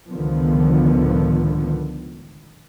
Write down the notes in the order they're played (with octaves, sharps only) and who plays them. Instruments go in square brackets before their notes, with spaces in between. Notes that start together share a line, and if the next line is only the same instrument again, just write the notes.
[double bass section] C#2 A2 D3 D#3 F3 B3